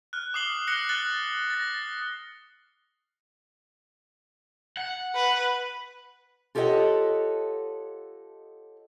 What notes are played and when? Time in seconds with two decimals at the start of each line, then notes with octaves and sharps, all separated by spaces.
0.13 F6 F#6
0.34 D6 D#6 C7 F#7 G7
0.68 F#6 A#6 C#7 F#7 G7
0.89 F#6 A6 F#7 G7
1.50 A6 A#6
4.77 F#5
5.15 B4
6.55 F4 G4 A4 C#5 D#5 F#5